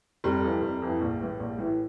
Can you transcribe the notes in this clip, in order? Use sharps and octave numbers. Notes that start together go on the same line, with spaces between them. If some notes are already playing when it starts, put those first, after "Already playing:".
F1 G3
F2 E3
F1
F2 E3
A#1
A2 E3
A#1
A2 E3